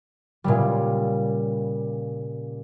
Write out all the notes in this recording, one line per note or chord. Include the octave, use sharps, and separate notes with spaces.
A#2 C#3 G3